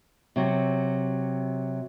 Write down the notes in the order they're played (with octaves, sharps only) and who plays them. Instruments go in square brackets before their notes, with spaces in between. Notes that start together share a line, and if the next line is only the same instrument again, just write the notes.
[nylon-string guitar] C3 F#3